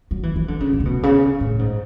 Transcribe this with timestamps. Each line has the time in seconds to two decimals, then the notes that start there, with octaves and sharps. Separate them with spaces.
0.11 F#3
0.23 E3
0.36 E3
0.48 D3
0.60 C#3
0.73 A2
0.80 C#3
0.85 B2
1.03 C#3
1.40 A2
1.59 G#2